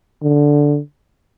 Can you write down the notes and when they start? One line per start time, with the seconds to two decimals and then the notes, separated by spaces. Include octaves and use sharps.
0.22 D3